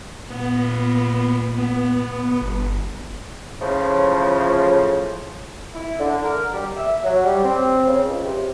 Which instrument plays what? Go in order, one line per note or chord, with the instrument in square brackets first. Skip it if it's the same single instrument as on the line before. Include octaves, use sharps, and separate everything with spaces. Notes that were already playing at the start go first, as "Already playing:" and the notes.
[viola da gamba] A#2 [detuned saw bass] B3
[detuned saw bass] B3
G1
[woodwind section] A2 C#3 F3
E4
D3
A#4
G3
E5
F#3
G3
C4
C#3
C#2
C3